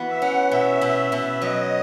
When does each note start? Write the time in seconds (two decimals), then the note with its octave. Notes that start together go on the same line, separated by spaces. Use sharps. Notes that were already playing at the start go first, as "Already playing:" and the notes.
Already playing: E3 B3 F#4
0.09 E5
0.21 C#4 F#5
0.51 B2 E5
0.81 B2
1.12 B2
1.41 F#3 D#5